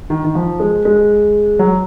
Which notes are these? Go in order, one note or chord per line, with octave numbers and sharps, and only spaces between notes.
D#3
D#3
F3
G#3
G#3
F#3